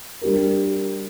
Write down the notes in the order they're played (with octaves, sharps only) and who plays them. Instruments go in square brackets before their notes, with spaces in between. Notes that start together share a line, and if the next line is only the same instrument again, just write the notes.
[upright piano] G3 D4 G4 A#4